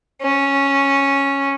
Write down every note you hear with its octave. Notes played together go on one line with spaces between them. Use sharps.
C#4